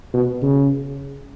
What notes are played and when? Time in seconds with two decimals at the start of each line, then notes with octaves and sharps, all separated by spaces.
0.13 B2
0.42 C#3